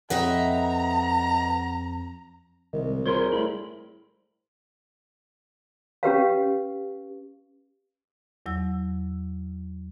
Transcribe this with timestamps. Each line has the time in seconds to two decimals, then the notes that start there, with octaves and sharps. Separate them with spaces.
0.10 F2 B4 D#5 E5 F#5 G5 A#5
2.73 C2 C3 D#3 G#3
3.06 F4 G#4 A#4 C5 C#5 C6
3.32 A2 G3 E4 B5
6.03 C#4 G4 B4 F5
8.46 E2 F#3 E6